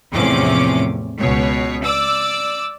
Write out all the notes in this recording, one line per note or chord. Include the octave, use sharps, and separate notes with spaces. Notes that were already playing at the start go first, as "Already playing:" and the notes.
E2 A2 C3 F3 C#4 D6
C#2 B2 C#5
D5 D6 E6